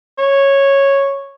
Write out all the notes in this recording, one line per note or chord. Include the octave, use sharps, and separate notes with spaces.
C#5